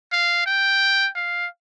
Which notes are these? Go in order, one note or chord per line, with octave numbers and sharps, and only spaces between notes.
F5
G5
F5